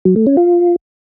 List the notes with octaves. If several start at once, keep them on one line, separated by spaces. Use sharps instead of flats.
F#3
A3
C#4
F4